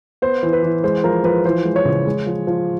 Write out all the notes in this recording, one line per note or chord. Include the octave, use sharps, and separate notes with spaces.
B3 C5
E3
B4
E3
G#3 C5
F3 A#4
F3 B4
E3 C5
G#3
C#5
C#3
G#3
F3
F3